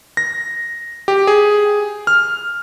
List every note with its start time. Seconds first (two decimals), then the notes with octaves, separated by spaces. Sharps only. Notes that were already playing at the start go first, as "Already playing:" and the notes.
0.17 A#6
1.08 G4
1.27 G#4
2.07 F6